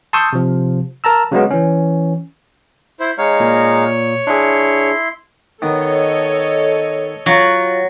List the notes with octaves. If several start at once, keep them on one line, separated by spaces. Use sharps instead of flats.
A5 C6 C#6 D#6 E6 G6
C3 F3
A#4 A5 A#5 E6
C#3 F#3 G#3 B3
E3 C#4
E4 C5
G#3 D#4 C#5 F5
A#2
D4 E4 G#4 C6
D#3 B3 A4 C#5 D#5
F#3 F4 F#4 F#5